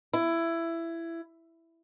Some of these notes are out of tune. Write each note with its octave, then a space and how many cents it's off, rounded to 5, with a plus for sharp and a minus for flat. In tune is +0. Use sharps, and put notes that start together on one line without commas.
E4 +15